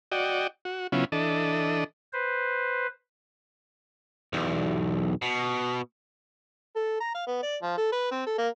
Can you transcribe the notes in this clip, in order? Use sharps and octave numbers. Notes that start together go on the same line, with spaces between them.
F#4 D5 D#5 G5
F#4
C#3 F#3 B3 C#4 E4 F4
E3 D4 A4 D#5
B4 C5
B1 E2
B2
A4
A#5
F5
B3
D5
F3
A4
B4
C4
A4
A#3